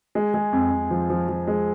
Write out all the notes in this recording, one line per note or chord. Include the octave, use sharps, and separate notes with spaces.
G#3
G#3
F2
F2
F3
F3
F3
G#3